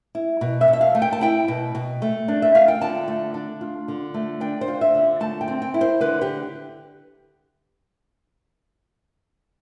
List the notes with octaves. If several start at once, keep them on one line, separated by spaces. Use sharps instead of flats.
E4
B2
E5
B2
E5
F5
A3
G5
A5
E4 G5
B2
B2
A3
D4
E5
F4 F5
G5
D3 A5
A3
D4
F4
D3
A3
D4 G5
C5
F4
E5
D3
A3 A5
G5
C4
G5
E4
C5
D3 B4
G4